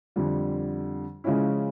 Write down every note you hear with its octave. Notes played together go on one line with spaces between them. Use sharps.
F2 D3 G3
C#3 F3 G#3 C#4 E4